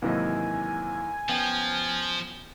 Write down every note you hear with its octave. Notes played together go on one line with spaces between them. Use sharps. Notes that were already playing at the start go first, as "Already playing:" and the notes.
D#2 G#2 C3 E3 F#3 D#5 G#5
F3 B3 C#4 G5